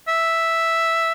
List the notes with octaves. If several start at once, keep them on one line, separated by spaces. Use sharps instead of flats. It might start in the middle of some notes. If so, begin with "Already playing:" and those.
E5